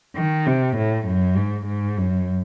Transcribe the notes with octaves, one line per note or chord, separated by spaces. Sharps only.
D#3
C3
A2
F#2
G#2
G#2
F#2